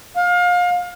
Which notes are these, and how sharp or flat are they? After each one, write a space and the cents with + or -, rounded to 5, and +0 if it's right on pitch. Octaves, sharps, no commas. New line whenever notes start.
F5 +30